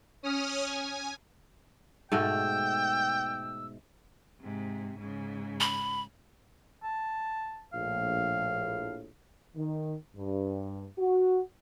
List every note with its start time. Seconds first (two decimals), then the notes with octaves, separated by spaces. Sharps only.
0.23 C#4 D#6 F6
0.66 G#5
2.12 G#2 B2 A3 G5 E6
4.42 G#2 C3
4.98 G#2 C#3
5.60 B5
6.84 A5
7.73 A#1 A2 F5
9.55 D#3
10.15 G2
10.98 F#4